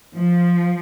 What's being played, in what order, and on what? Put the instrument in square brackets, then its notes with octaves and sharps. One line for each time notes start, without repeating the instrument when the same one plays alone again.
[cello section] F3